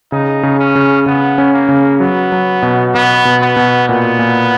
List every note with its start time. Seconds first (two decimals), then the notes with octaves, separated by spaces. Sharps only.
0.12 C#3 D#4
0.43 C#3
0.59 C#4
0.75 C#3
1.06 C#3 B3
1.38 C#4
1.53 A#3
1.69 C#3
2.00 F#3 B3
2.32 F#3
2.63 B2
2.94 B2 B3
3.25 B2
3.42 B3
3.56 B2
3.88 A#2 B3
4.19 A#2